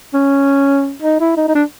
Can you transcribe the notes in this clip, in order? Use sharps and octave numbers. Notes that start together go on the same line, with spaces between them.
C#4
D#4
E4
D#4
D#4
D4